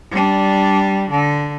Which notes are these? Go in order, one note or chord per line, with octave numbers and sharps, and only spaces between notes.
G3 D4
D3